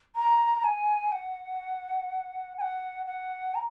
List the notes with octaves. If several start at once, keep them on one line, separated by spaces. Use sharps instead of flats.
A#5
G#5
F#5
G#5
F#5
F#5
A#5